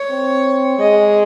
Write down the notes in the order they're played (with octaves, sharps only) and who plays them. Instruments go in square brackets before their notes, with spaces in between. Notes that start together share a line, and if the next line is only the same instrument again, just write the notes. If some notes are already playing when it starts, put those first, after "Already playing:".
Already playing: [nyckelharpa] C#5
[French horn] C4
[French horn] G#3 [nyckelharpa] D#5